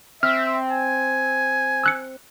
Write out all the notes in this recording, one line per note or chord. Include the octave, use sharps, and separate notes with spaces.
C4 E5 F6
G#5
E6 F#6 C#7